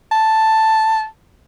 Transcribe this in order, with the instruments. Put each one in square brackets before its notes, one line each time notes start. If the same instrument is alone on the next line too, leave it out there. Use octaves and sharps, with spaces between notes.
[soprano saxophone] A5